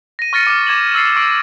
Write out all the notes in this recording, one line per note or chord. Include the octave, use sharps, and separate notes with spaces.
A#6 D#7
C#6 F6 A6 A#6 C#7 D#7
D6 F6
D6 G#6 E7 F#7
E6 A6 C7 C#7
C#6 E6 C7 D7